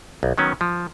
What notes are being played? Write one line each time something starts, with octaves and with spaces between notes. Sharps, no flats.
B1
D#3 F#3 B3 C#4
F3